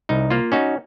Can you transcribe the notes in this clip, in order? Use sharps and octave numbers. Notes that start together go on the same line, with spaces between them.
C2 D#4
A#3 F4
C#4 D#4 F#4